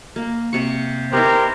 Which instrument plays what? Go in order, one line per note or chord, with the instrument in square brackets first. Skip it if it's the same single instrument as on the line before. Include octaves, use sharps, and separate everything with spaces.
[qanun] A#3
C3 C#6
[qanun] B3 D#4 E4 [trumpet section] G4 A#4 C5